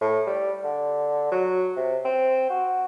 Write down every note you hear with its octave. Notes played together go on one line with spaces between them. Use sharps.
A2
G3
D3
F#3
C3
C4
F#4